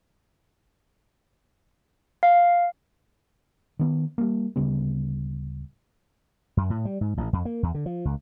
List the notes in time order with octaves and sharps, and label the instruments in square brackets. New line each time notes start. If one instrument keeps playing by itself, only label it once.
[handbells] F5
[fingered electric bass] D#3 B3
G3 A#3
D1 C#3 G3 B3
[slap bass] F#2
A2
G3
G#2
A1
F2
A#3
E2
D3
F3
C#2